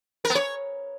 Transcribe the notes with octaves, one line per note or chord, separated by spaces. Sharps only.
A#4
B3
C#5